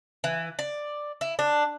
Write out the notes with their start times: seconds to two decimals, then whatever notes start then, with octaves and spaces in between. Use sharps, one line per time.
0.24 E3
0.59 D5
1.21 E4
1.39 D4